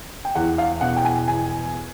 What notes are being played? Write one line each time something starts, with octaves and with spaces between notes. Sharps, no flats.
G5
E2 F#5
F5
B2 F#5
G5
G#5
E2 G#5